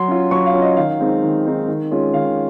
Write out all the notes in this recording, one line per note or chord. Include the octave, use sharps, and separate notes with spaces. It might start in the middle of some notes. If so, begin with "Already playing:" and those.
Already playing: F#3 C6
C#4 F4
F#3 C#6
F5
C#4 F4
D#5
D#3 F5
G#3 C4 D#4
D#3
G#3 C4 D#4
D#3
G#3 C#4 F4
D#3 F5